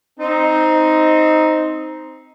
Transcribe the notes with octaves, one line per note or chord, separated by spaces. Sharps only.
C4 D#4